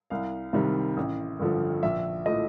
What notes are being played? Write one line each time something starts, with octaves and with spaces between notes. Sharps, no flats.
C2 F5
C3 D#3 G3
A1
G2 D3 F3
A#1 E5
A2 F3 A3 D#5